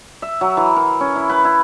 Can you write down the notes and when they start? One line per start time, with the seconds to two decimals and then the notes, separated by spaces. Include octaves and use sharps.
0.22 E5
0.41 F#3
0.57 E3
0.76 A#4
1.00 C#4
1.16 E4
1.30 B4
1.45 E4